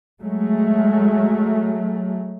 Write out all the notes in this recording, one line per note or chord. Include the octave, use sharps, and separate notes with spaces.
F#3 G#3 A3